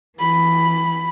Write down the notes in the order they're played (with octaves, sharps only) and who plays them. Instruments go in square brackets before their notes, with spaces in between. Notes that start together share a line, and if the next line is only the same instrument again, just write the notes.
[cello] E3 [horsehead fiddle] B5